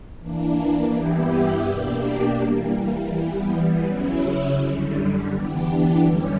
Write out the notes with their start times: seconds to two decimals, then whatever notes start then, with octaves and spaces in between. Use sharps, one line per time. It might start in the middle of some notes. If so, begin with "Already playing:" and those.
0.20 E3 A#3 D4
0.94 G2 E3 B3 E4 G4
1.66 B2 A#3 D4 G4
2.39 E3 G3 A#3
3.12 E3 G3 B3
3.84 C#3 F#3 C#4 E4
4.57 F#2 D3 G3
5.30 E3 B3 D4 G4
6.02 F#2 D3 G3 C#4